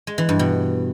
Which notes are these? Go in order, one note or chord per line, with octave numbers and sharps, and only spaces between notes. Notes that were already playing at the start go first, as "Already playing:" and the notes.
G#3
E3
G2
B2